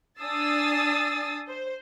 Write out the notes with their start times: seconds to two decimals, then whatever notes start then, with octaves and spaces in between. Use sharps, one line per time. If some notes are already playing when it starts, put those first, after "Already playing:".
0.21 D4 G#5 D#6 E6 A6 C7
1.47 C5